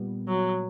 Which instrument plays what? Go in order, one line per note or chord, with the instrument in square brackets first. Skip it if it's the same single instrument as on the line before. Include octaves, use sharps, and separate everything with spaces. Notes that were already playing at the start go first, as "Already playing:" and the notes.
Already playing: [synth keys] A#2 G3 B3
[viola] F#3